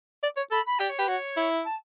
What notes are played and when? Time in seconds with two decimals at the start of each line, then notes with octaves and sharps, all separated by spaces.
0.23 D5
0.37 C#5
0.51 A4 B5
0.66 B5
0.79 G4 D5
0.89 C#5
0.98 G4 B4
1.08 F#4 C#5
1.37 E4
1.64 A5